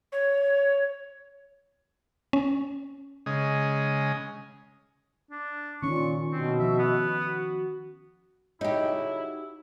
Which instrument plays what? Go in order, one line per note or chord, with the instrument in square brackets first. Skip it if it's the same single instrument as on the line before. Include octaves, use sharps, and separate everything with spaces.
[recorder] C#5
[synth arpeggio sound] C#4
[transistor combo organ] C#3 G#3 D#5
[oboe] D4
[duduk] A#2 [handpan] D#3 C#4 [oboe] C#6
[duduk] B2 [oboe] C4
[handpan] F3 [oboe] E5
[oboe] B3
[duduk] F#4
[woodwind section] C#3 F#3 E4 [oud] D#4 G4